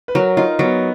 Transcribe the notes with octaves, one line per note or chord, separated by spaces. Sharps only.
B4
F#3 A#4
D#4 F4
F#3 B3